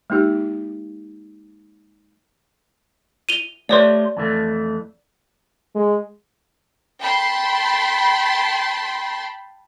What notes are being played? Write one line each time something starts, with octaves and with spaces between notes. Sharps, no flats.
G#3 A#3 D#4 G4
D#7 F7 G7
A3 G4 B4 C#5 D5 C6
F2 E3 A3
G#3
G5 A5 B5 C6